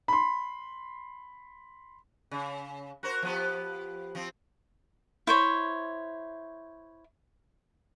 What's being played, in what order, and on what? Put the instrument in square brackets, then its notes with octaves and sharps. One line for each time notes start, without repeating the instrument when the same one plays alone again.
[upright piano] B5 C6
[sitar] C#3
F#4 A#4 C5
F3 B3 G4
F3 C4
[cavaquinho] E4 C5 C#5